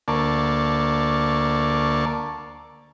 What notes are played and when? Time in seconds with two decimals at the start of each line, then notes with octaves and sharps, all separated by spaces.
0.08 D2 A#3 D5 A5 C#6